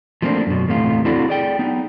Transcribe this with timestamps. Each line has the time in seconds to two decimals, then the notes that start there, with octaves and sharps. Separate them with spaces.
0.22 F3 A3 A#3 C4 D4
0.47 F#2 B2
0.68 E2 A2 C3 A3 F4
1.05 C4 D4 E4 F#4 A4 D5
1.28 G#4 D5 G5
1.59 B3 D#4